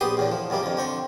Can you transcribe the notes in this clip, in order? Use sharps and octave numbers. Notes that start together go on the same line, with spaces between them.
A#1 B3 G4 C6 D#6
E2 A2 D3
F3
F#2 B2 G3 A#3
F2 D3
D3 C4 C#6